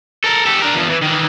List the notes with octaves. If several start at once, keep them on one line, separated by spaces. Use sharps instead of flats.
A4 A#4
G4 A4
D4 A#4
E2 F3
E3
D#3 E3